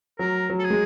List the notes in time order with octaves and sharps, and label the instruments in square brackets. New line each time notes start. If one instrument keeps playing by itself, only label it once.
[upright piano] F#3 [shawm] A#4
[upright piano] F#3
[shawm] A4
G#4
[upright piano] G#3